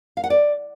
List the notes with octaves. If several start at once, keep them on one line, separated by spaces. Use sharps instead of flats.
F5
F#5
D5